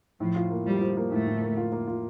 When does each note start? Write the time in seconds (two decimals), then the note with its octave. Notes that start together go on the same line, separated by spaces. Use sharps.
0.20 A2 F3
0.36 F4
0.50 A#3
0.66 F3 G3
0.81 F3
0.97 A#3
1.11 A2 A3
1.27 A2
1.42 A#3
1.57 F4
1.72 A#3
1.88 F4